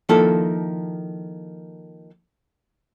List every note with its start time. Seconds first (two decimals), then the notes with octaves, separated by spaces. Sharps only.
0.09 D#3 F3 A#3 E4 A4 A5